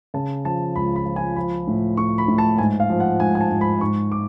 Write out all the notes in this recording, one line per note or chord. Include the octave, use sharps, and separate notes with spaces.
C#3 A5
F3 A5
C#2 B5
B5
F3
G#5
F3 B5
A2
A2 C#6
B5
A2
A5
G#2 G#5
F5
F3
F#5
G#2 G#5
G#5
A5
G#2
B5
G#2 C#6
D6